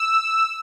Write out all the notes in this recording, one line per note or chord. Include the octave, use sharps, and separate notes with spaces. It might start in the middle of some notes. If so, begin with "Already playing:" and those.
Already playing: E6